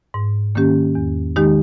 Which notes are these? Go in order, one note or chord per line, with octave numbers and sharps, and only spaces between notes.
G#2
D#3 A#3 C#4 G4
E2
D#3 G#3 D#4 G4